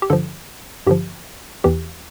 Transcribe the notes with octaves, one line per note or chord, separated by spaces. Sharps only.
G4
G2 D3 F3 A4
G2 D3 F3 G4
E2 E3 G4